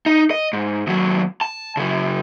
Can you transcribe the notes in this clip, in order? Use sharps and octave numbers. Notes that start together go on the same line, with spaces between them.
D#4
D#5
G#2
D#2 F#3
A5
C#3 F#3